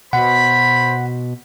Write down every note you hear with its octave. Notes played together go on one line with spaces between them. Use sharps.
B2 C5 F#5 B5